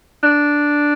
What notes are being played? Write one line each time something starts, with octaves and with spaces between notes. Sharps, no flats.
D4